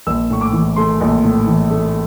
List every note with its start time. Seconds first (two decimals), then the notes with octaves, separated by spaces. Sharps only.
0.07 A#1 E6
0.30 A2 C#6
0.41 D6
0.53 E3
0.76 A3 C6
1.01 A#1
1.24 A2
1.47 E3
1.71 A3